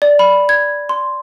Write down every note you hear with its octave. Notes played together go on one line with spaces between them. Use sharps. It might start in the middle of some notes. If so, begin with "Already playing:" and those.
D5
B5
G#6
C6